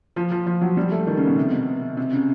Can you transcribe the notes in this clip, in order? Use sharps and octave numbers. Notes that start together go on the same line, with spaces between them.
F3
F3
F3
F#3
G3
A3
D#3
C#3
B2
C3
B2
C3
C#3